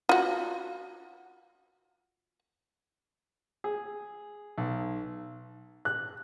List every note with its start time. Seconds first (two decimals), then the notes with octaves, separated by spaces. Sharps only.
0.09 F4 F#4
3.64 G#4
4.58 B1
5.85 F#6